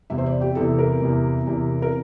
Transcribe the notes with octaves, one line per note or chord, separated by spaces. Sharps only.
E2 C3 E3 E5
C5
D5
G4
E2 C3 E3 A4
A#4
E2 C3 E3
E2 C3 E3
A#4